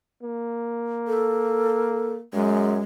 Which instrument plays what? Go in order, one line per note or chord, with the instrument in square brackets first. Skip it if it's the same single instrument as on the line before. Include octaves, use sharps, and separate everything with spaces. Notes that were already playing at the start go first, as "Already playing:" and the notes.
[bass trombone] A#3
[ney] A4
[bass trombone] F#2 [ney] G#3